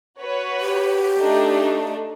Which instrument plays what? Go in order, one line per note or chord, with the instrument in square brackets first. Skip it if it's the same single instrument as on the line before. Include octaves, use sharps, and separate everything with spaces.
[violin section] F#4 B4 C#5
[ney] G4
[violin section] A3 D4 D#4